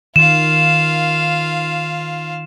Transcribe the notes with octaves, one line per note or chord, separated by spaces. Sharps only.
D#3 F4 F5 E7